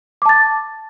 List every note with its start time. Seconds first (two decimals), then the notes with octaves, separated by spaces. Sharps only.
0.22 D6
0.26 A5
0.29 A6